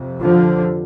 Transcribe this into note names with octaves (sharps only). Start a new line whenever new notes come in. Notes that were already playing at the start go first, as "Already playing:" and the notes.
Already playing: F2 C3
D3 F3